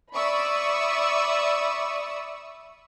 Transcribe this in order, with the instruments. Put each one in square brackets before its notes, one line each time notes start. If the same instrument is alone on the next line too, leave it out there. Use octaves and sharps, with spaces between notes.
[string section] D5 E5 B5 C#6 D#6 E6